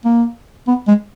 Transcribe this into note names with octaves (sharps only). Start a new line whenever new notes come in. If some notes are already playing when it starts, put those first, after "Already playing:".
A#3
B3
G#3